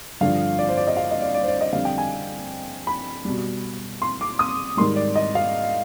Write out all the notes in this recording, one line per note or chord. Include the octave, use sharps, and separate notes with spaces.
G2 D3 F3 F5
D5
C5
D5
D#5
F5
D#5
D5
D5
C5
D5
D#5
F2 D3 G3 F5
G5
G#5
B5
B2 G3
C6
D6
D#6
G#2 D#3 G3 C6
D5
D#5
F5